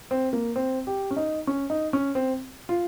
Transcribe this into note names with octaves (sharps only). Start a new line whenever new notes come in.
C4
A#3
C4
G4
C#4
D#4
C#4
D#4
C#4
C4
F4